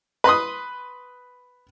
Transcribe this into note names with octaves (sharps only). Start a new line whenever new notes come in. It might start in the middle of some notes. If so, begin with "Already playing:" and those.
B4 B5 C6 D#6